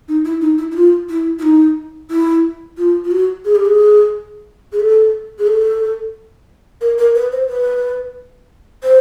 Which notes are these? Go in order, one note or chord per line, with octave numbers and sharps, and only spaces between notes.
D#4
E4
D#4
E4
E4
F4
E4
E4
D#4
E4
F4
F4
F#4
G#4
G4
G#4
G#4
A4
G#4
A4
A#4
A#4
B4
C5
B4
C5